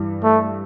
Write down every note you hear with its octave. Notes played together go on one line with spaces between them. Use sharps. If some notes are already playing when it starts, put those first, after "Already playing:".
Already playing: G2 E3 G3
A3